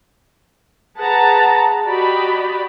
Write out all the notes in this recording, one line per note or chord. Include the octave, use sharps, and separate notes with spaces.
G#4 B4 F#5 A5 A#5
F#4 G4 D5 D#5 B5